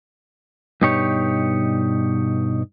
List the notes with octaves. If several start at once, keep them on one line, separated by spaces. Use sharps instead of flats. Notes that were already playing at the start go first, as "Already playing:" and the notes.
G2 B2 D#4 G4 C#5